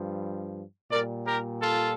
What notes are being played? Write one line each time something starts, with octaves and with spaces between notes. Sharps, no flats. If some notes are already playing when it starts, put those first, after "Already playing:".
Already playing: G2 F3
A#2 G3 A#4 D5
G4 A#4
F4 A4